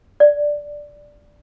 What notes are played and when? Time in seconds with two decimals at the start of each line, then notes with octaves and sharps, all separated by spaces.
0.20 D5